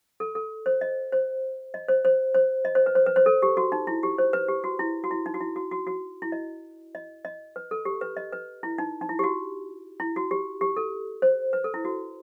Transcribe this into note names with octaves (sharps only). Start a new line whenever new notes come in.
A4
A4
C5
D#5
C5
D#5
C5
C5
C5
D#5
C5
B4
C5
B4
C5
A4
G4
F#4
D#4
E4
G4
C5
B4
G4
F#4
E4
F#4
E4
D#4
F#4
E4
F#4
F#4
F#4
E4
D#5
D#5
D#5
B4
A4
G4
B4
D#5
B4
E4
D#4
D#4
E4
G4
F#4
E4
F#4
G4
G4
A4
C5
B4
A4
E4
F#4